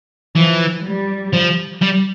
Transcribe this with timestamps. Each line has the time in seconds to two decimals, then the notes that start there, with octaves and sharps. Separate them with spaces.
0.36 E3 F3
0.85 G3
1.33 F3
1.82 G3